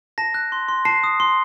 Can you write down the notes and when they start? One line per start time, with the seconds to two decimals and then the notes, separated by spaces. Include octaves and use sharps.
0.18 A5 A#6
0.34 F#6
0.52 C6
0.68 C6
0.85 A5 C7
1.04 D#6
1.20 C6